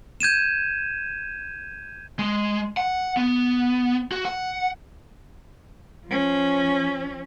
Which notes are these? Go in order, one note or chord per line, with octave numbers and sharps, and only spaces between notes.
G6 G#6 D#7 E7
G#3
F#5
B3
F#4
F#5
F3 C#4